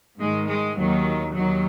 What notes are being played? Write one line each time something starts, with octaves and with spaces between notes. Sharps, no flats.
G#2 D#3 G#3
G#3
D#2 D#3 F#3
D#2 D#3 F#3